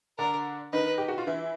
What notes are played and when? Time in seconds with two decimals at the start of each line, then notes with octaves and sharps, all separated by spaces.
0.18 D3 D4 A#4
0.73 D#3 D#4 B4
0.98 G4
1.08 F#4
1.18 F4
1.27 E3 E4